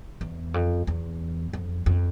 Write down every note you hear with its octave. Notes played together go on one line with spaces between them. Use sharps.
E2
F2
E2
F2
F2